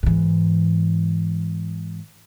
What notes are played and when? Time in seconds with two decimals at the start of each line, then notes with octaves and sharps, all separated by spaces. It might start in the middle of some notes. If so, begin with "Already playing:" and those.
0.03 G#2 E3